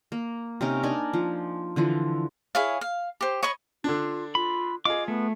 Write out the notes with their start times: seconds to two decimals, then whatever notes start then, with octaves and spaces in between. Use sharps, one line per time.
0.12 A#3
0.61 C3 C#4 D#4 A#4
0.83 D4 D#4 A#4 G#5
1.13 F3
1.76 D3 E3 F3
2.55 E4 G#4 C#5 F5
2.81 F5
3.21 G4 C5
3.43 C#5 D#5 B5 C#6
3.84 D3 D4 F4
4.35 F4 B5
4.85 F4 G#4 D#5 D6
5.08 A3 B3